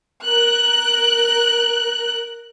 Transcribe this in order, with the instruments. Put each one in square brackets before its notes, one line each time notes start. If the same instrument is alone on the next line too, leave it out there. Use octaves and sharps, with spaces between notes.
[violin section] A#4 F#6